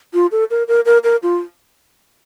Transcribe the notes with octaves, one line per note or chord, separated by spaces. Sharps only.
F4
A4
A#4
A#4
A#4
A#4
F4